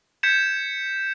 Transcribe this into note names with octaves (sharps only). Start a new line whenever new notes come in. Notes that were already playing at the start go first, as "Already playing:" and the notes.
G6 G#6 B6 C#7 E7